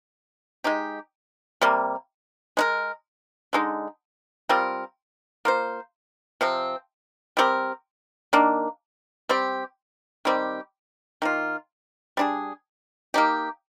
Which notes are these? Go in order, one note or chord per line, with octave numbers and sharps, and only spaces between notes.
G#3 D#4 G4
C3 G3 A#3
G#3 D#4 A#4
D3 G#3 D#4
G3 C4 F4 A#4
A#3 F4 C5
C3 F3 C4
G3 C4 G4 A#4
D#3 A#3 D4
G3 C4 G4
D#3 G3 C4 G4
D#3 A#3 F4
G3 D4 F4 G#4
A#3 D#4 G4